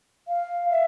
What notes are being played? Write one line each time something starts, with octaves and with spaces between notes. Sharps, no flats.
F5
E5